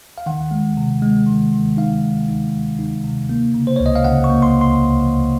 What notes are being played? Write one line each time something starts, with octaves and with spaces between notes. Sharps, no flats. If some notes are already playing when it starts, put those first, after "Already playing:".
F5
D#3 F#5
G#3
C3
G#3
D#3
D#3
D#4 F5
G#3
D#4
G#3
D#4
C3
A#3
C#3
C5
C#2 C#5
D#5
F5
C#3 F#5
C#6
A#3
C6
C#2
C6
C#2
F3